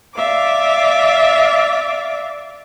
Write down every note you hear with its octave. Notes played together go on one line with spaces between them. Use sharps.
D5 E5 F5 D6